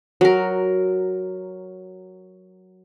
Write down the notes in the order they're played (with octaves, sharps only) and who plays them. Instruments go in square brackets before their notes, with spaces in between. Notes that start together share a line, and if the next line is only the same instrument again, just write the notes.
[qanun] F#3 A#4